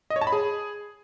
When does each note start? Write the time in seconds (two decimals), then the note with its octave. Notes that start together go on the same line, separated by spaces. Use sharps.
0.10 D#5
0.16 C#5
0.21 A5
0.27 B5
0.32 G#4